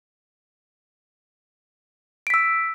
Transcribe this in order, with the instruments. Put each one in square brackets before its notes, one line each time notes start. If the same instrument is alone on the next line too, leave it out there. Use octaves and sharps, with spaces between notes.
[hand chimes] D7
B6
E6